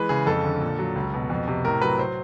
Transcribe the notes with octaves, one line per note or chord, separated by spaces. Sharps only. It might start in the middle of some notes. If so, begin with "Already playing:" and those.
Already playing: E3 G#3 B4
C#3 G#4
F2 A4
D3
A#2
F#3
C#2
B2
F2
C3
A2 A#4
F#3 B4
C5